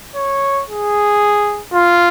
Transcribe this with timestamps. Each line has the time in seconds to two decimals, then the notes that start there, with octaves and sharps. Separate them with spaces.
0.16 C#5
0.68 G#4
1.73 F4